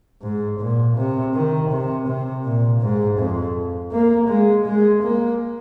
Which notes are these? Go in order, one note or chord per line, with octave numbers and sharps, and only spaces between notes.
G#2
A#2
C3
D#3
C3
C3
A#2
G#2
F2
A#3
G#3
G#3
A#3